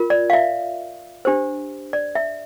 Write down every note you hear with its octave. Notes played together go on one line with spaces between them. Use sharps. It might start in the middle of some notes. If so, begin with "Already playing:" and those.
Already playing: F4 A#4
D5
F5
E5
D4 G4 C5
D5
E5